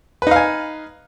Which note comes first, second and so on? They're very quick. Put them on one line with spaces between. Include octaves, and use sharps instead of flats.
B4 D#4 F5 G#5